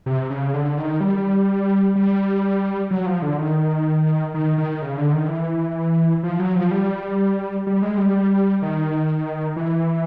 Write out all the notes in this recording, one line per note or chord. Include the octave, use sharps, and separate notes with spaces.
C3
C#3
D3
D#3
G3
G3
F#3
F3
D3
D#3
D#3
D#3
C#3
D3
D#3
E3
F3
F#3
F3
G3
G3
G#3
G3
D#3
E3